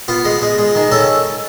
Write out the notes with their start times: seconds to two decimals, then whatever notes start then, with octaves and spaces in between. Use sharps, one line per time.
0.08 B3 F4
0.25 G#3
0.42 G#3
0.58 G#3
0.75 D#3
0.92 C#4 A4